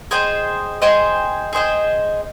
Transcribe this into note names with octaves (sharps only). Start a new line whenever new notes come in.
G#4 C5 D#5 G5
G#4 C5 D#5 G5
G#4 C5 D#5 G5